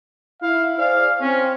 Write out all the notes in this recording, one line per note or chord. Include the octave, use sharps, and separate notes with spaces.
E4 F5
G#4 C5 D5 F5
C4 C#4